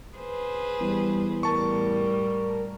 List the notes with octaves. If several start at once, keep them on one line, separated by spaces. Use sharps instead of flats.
G#4 B4 C5
E2 G3
A2 G3 A#4 A5 C#6